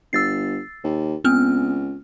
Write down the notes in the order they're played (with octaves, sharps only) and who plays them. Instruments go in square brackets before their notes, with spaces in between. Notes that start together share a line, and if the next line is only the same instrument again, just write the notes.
[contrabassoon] G1 [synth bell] E6 A6 C7
[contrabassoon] D#2
[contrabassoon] C#2 [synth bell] B3 C4 F6